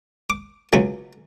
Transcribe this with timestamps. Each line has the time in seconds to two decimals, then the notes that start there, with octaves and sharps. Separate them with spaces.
0.30 D6
0.73 C#2 C#3 F#3 G#5